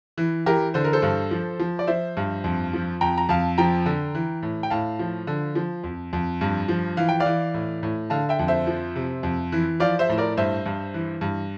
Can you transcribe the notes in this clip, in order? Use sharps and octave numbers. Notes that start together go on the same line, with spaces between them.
E3
E3 G4 A#4
D3 C5
A#4
A4 C5
G2
F3
F3
D5
F3 C5 E5
G2
F2
F3
F2 G5 A#5
A#5
F2 F5 A5
F3 G5 A#5
D3
E3
A2
G5
A2 F5 A5
F3
D3
F3
F2
F2
G2
F3
E3 F5
G5
D5 F5
E3
A2
A2
D3 F5 A5
E5 G5
F2
C5 E5
F3
C3
F2
E3
F3 D5 F5
C5 E5
A2
A#4 D5
G2 C5 E5
G2
E3
G2